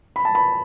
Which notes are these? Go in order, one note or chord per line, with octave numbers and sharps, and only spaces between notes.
B5
A5
B5